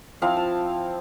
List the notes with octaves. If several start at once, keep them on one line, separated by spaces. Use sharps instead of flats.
F3 C4 E4 F5
A5